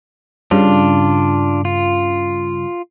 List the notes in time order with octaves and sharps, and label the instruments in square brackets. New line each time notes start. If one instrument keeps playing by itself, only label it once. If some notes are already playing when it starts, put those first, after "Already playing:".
[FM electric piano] G2 C#3 [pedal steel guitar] D4 F4
[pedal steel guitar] F4